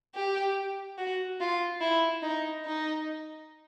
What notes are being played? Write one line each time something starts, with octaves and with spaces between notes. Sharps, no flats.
G4
F#4
F4
E4
D#4
D#4